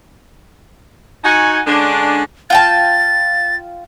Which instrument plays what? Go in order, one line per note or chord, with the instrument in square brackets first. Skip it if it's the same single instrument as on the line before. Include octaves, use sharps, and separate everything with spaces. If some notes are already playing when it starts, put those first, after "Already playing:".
[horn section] D#4 F#4 G#5
D3 G#3 C#4 D4
[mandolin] F4 G5 A5 [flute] A6